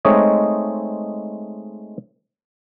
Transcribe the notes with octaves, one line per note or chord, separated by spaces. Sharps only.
G#3 A3 C4 D#4 C#5 D#5